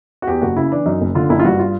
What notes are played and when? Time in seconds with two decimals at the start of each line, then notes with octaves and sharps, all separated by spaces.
0.22 F#4
0.27 E2 G4
0.42 F#1 F#4
0.57 C#3 E4
0.71 E3 D4
0.86 F#2 D#4
1.00 F#1
1.15 D3 F4
1.29 F#1 E4
1.39 F4
1.45 G2 F#4
1.59 F4